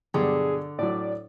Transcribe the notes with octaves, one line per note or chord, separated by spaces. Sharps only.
G2 B2 D3 F#3 G#4
A2 F#3 D5